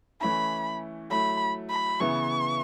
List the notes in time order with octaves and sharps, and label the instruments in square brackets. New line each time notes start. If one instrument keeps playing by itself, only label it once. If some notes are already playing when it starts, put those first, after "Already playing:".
[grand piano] E3 A3 C#4 E4 [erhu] B5
[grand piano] F#3 A3 E4 [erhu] B5
[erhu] B5
[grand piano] C#3 E3 B3 E4 [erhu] C#6